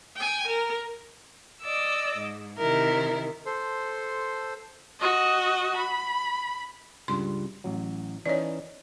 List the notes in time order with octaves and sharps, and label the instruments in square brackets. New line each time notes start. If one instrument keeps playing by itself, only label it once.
[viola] G5 G#5
A#4
[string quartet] D5 D#5 D6 E6
G#2
C3 D#3 E4 A#4
[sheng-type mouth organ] A4 C5 C6
[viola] F#4 D#5
B5
[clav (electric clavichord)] C#2 G2 [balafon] C6
[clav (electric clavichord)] A1 F#3
[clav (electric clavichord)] E3 C#4 D#4 [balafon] C#5 D5